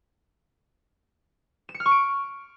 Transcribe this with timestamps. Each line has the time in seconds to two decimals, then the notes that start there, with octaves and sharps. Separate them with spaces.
1.69 E7
1.74 C#7
1.80 F6
1.86 C#6
1.91 D7